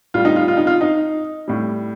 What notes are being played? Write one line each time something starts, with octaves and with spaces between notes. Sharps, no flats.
A2 G3 F4
D#4
F4
F4
D#4
F4
D#4
A2 G3